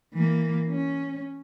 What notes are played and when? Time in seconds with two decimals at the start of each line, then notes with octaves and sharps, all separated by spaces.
0.14 E3 A#3
0.69 C#4